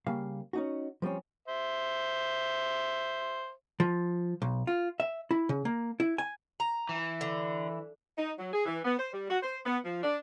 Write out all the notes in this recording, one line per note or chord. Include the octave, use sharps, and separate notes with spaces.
C#3 G3 A#3 F5
C#4 D#4 F#4
F3 G3 C4 C#4
C5 E5
F3
B1
F4
E5
E4
C#3
A#3
E4
G#5
A#5
E3
D3
D#4
F#3
G#4
E3
B3
C5
G3
F#4
C5
B3
F3
D4